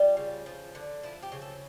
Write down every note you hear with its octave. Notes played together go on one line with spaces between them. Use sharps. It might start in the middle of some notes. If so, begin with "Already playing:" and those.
Already playing: G3 F4
C#3
F3
D3
F3 E4
G4
C#3
A4